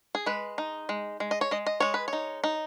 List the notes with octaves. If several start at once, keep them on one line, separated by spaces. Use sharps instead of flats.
G#4
G#3 B4
D#4
G#3
G#3
D#5
C#5
G#3 D#5
D#5
G#3 C#5
B4
C#5
D#4
D#4